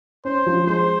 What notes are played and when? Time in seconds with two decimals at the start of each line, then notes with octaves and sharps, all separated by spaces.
0.25 C#4 C5
0.46 F3
0.67 G#3 C5